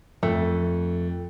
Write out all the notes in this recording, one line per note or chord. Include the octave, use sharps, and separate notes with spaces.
F2 A3